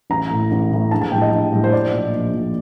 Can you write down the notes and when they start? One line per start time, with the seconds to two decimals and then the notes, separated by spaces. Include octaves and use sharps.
0.10 A1 A#5
0.31 A2 A3
0.51 A1
0.71 A2 A3
0.91 A#1 A5
1.01 A5
1.12 A2 G3 G5
1.22 D#5
1.32 A#1
1.53 A2 G3
1.64 C5
1.73 A#1 D5
1.93 A#2 F3
2.14 A#1
2.34 A#2 F3